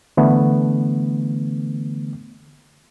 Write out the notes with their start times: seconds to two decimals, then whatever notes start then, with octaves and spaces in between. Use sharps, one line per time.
0.17 D3 E3 A3 B3